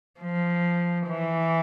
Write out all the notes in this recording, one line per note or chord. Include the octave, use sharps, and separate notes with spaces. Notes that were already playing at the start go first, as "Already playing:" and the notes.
F3
E3